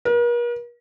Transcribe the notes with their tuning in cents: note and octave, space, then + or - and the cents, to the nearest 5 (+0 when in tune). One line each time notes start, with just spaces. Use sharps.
A#4 +45